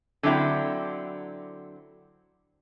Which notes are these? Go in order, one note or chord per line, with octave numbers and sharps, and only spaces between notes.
D3 F#3 C4 E4 A4 G5